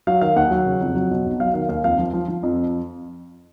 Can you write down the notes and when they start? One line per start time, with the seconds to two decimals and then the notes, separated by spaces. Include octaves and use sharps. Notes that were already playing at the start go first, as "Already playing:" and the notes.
0.07 F#3 F5
0.21 D#3 F5
0.36 D#2 F#5
0.51 F#3
0.66 C#3
0.81 F2
0.95 F#3
1.11 B2
1.26 B1
1.40 F#3 F5
1.54 D#3 F5
1.69 D#2 F5
1.83 F2 F5
1.98 F3
2.13 F3
2.28 F3
2.43 F2